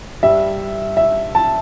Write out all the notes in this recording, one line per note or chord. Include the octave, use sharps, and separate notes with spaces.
G2 G3 E5
E5
A5